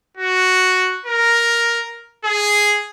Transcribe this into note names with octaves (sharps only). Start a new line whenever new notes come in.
F#4
A#4
G#4